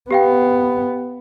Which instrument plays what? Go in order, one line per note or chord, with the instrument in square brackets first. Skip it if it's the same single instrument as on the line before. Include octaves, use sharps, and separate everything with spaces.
[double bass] B3 [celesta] G4 F5 G5